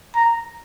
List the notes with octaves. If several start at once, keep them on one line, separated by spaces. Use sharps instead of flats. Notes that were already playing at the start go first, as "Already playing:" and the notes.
A#5